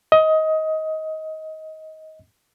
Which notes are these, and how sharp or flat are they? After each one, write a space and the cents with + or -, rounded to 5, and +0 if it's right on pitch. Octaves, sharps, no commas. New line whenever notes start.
D#5 +20